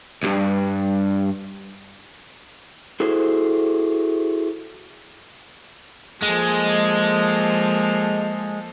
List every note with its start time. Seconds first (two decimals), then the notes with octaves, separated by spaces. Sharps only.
0.23 B1 G2
3.00 E4 F#4 G#4 A4 C5
6.22 F3 G#3 A#3 A4